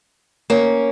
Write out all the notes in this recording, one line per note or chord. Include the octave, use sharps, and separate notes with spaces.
A#3 C#4